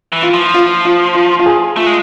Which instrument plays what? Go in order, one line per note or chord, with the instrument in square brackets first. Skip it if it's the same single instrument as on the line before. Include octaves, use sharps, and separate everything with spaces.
[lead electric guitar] E3
[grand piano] F4
[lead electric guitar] F3
[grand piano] F4
F4
F4
F4
G#4
[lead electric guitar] A3 [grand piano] F4
[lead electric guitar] G#3